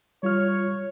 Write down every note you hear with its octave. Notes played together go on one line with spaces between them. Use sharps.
G3 F4 C#5 F6